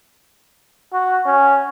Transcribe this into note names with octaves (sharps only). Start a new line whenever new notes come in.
F#4
C#4